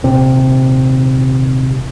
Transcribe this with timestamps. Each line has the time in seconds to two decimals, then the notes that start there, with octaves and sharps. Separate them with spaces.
0.04 D#1 C3